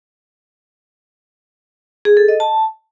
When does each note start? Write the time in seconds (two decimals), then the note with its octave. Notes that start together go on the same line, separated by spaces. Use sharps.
2.05 G#4
2.17 A4
2.28 D#5
2.40 A5